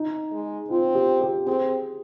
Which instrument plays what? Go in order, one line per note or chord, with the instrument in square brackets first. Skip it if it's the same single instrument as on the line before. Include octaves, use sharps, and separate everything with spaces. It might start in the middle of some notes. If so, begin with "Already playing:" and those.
Already playing: [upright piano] D#4
[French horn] G#3
[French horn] C4 [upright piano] F4
[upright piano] G4
G4
[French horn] C4 [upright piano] G#4